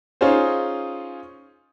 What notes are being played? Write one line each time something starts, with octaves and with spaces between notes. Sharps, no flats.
C#4 D#4 F4 G#4 C5